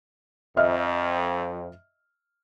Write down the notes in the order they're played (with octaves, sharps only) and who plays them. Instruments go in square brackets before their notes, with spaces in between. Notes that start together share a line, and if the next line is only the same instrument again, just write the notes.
[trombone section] F2 [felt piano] D#5 E5 F6